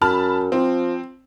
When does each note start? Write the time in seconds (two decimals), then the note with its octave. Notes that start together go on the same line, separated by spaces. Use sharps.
0.02 F#2 A5 B5 F6
0.52 F3 C4